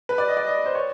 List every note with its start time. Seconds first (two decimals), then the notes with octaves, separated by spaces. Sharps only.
0.09 B4
0.18 D5
0.28 D#5
0.37 D5
0.47 D#5
0.66 C5
0.75 C#5